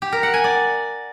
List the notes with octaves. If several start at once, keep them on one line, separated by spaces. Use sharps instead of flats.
G4
A#4
F#5
G#5
D5